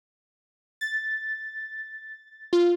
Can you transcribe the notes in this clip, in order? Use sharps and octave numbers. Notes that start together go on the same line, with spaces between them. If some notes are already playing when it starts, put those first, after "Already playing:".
A6
F4